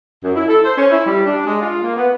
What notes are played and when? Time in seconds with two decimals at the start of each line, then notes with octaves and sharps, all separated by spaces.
0.24 F#2
0.35 E4
0.48 A4
0.64 C5
0.76 C#4
0.91 E4
1.07 G3
1.26 D4
1.46 G#3
1.61 F4
1.82 A#3
1.97 B3